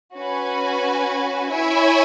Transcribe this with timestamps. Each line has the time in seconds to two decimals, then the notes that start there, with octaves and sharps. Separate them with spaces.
0.14 C#4 F#4 B4 G#5
1.50 E4 C#5 E5 G#5